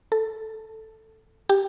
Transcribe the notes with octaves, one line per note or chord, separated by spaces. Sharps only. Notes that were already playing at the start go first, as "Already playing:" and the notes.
A4
G4